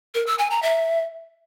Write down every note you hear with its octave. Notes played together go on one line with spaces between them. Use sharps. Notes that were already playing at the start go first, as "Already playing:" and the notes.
A#4
E6
G#5
A#5
E5